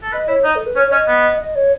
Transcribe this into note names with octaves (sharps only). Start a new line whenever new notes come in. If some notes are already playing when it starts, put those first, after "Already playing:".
A4
B4 D#5
E4 C#5
D#4 D#5
A4
B4
C#4 C#5
C#5
C#4 D#5
B3
D#5
C#5